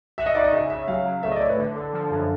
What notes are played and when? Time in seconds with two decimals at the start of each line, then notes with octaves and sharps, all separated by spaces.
0.18 F#4 E5
0.26 D#5
0.35 D#4 D5
0.44 D#5
0.53 C#3 E5
0.70 C#3 E5
0.88 F#3 F5
1.06 F#3
1.23 A3 E5
1.32 D#5
1.36 D5
1.40 A2 C#5
1.50 B4
1.58 D3
1.76 D3 A4
1.93 F3
2.11 F#2